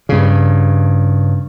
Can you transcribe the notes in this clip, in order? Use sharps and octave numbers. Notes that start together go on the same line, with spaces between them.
G2 C#3